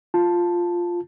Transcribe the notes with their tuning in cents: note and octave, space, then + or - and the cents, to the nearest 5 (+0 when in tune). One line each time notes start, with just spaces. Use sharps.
F4 +0 A5 +0